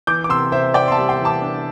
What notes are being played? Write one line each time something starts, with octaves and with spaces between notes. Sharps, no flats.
E3 D6 G6
D6
C3 C6 E6
C3 C5 E5
C3 D5 G5
C6
E5 A5
G3
G5 C6
E3
A5 D6
D4